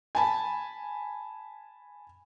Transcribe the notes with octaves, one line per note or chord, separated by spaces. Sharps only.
G#5 A5 B5